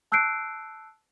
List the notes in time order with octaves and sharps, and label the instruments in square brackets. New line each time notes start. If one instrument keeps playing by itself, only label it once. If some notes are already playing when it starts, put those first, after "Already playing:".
[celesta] A5 E6 F#6 G6 C7 D7